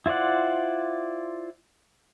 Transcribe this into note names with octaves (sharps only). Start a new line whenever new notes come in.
E4 F4 C5 D5 F#5